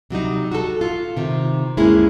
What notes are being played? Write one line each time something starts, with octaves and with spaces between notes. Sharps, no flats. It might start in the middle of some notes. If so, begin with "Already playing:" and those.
C3 F#3 G3 D#4
F#4 A4
F4
C3 D#3
D2 G2 G#3 A#3 C#4 E4